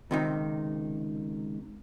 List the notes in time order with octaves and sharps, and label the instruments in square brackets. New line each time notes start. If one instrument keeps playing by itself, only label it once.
[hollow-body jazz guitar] C#2 C3 D#3